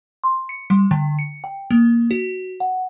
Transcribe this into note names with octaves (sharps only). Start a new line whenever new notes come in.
C6
C#7
G3
D3
C#7
G5
A#3
F#4
F#5